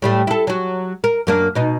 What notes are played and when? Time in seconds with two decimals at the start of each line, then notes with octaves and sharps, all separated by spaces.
0.02 A2 G3 A3
0.27 E4 A4
0.47 F#3 F#4
1.04 A#4
1.27 F#2 A#3 D4
1.55 B2 D#4